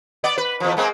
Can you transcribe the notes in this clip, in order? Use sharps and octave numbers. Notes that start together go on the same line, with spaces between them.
B3 D5
B4
E2 F3
G#3 A#3 C4